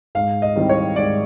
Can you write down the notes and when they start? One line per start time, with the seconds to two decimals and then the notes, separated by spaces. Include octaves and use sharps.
0.15 G#2 F5
0.42 D#5
0.55 D#3 G3 C4 E4
0.69 C#5
0.96 G#2 D5